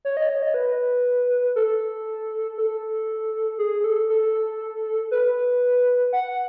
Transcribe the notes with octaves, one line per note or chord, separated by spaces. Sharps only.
C#5
D#5
C#5
D#5
B4
A4
A4
G#4
A4
A4
B4
F#5